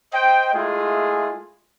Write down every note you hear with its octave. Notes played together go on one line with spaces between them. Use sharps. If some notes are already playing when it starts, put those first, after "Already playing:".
C5 D#5 G5
G#3 A3 E4 F4 G#4